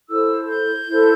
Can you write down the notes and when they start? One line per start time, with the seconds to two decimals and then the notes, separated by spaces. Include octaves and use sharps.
0.08 E4 A4 C5 E6
0.48 G6
0.87 E4 A4 C5